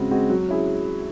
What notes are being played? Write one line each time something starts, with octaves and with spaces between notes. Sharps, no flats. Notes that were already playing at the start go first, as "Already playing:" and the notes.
Already playing: C#3 G#3 C4 F#4
G#3 C4 F#4
F#3
C#4 E4 G#4